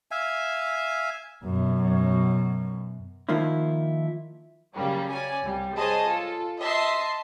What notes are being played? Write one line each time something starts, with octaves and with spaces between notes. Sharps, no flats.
E5 F5 G#5
F#2 B2
D#3 F3 A#3 D#4 E4
C#3 F#3 G3 A#3
C#4 D5 G#5
C2 G3
G#4 C5 C#5 D#5 G#5 A5
F4 A4
D#5 E5 A5 C6 D#6 C7